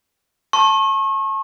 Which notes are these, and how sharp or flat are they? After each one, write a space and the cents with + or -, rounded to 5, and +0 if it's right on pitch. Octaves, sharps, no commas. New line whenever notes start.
A5 +0 C#6 -35